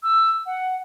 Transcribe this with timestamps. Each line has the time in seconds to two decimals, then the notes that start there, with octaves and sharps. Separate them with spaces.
0.03 E6
0.46 F#5